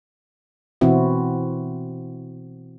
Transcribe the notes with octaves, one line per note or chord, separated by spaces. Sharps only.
B2 E3 C4 E4 F#4